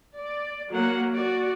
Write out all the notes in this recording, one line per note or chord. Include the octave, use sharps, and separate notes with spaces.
D5
F#3 A#3 F#5
F#4 D5